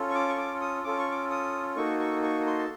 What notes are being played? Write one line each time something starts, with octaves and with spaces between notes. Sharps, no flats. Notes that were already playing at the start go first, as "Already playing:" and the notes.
Already playing: C#4 F4 A4
C#6
D6
C#6
D6
D#6
C#4 F4 A4 D6
C#6
D6
D#6
A#3 D#4 F#4 A4 C#6
C#6
C#6
C6
A5